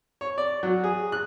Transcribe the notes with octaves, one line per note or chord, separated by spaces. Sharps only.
C#5
D5
F#3
G#4
F#6